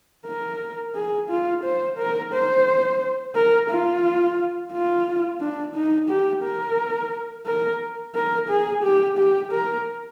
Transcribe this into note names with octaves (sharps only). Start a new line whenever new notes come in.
A#4
G#4
F4
C5
A#4
C5
A#4
F4
F4
D4
D#4
G4
A#4
A#4
A#4
G#4
G4
G4
A#4